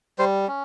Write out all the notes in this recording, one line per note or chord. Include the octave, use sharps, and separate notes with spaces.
G3 C5
C#4